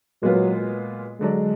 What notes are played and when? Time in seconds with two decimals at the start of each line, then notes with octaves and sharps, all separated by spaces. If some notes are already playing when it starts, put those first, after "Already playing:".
0.22 A#2 F#3 G#3 B3 F4
1.20 D3 F#3 G#3 D4